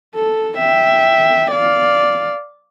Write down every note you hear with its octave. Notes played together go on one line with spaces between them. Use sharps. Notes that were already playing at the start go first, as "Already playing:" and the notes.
A4
E5 G5
D5 F5